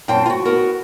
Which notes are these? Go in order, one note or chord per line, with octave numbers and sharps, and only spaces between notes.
F#2 A#2 C4 G5 A5
F4 F#4
B3 F#4 A#4